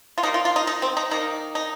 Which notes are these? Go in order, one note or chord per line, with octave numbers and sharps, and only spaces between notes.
F4
D#3 G3 A#3 D#4
F4
F4
D#4
D#4
C4
D#4
D#3 A#3 D#4
D#4